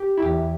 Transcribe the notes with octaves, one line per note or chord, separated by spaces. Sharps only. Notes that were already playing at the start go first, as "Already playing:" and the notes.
Already playing: G4
E4
E2 G4